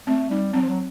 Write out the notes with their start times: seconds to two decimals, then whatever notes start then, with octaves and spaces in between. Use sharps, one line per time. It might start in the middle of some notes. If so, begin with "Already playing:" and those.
0.07 A3 C4
0.30 G3 D#4
0.53 F#3 C4
0.62 F3
0.70 F#3